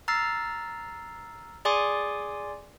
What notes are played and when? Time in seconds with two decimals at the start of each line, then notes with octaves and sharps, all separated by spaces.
0.08 A#5 E6 F6 A6 C7
1.65 G#4 D5 G#5 C6 D6 D#6